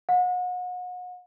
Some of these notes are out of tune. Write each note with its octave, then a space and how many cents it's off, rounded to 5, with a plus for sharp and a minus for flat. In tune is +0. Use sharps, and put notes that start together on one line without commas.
F#5 -35